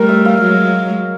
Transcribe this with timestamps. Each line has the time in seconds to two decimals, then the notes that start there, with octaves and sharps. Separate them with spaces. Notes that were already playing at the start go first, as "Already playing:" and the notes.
Already playing: G3 A3 A#4
0.09 E5
0.25 F5
0.41 F#3 G#3